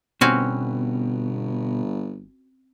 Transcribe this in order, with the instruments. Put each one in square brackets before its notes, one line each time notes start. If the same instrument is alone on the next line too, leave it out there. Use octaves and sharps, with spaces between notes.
[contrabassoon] G1 [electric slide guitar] B2 [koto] C4 C#4 F#4